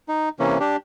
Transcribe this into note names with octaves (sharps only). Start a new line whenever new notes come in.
D#4
C3 E3 A#3 C#4
D4 G4